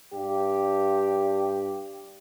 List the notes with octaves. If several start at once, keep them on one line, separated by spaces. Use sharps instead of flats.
G2 G4